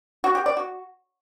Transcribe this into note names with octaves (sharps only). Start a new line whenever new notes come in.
F#4
G4
D5
F#4